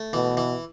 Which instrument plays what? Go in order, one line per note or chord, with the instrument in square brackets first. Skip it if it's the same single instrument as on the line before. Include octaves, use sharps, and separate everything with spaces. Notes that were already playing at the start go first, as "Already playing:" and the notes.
Already playing: [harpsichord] A3
[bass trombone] B2 [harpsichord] E3
[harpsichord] E3